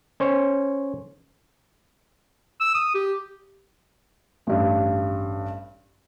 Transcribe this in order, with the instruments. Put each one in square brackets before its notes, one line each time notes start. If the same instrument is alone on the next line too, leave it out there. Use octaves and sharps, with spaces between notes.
[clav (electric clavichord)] C#4 C5 C#5
[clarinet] E6
D#6
G4
[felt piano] A1 G2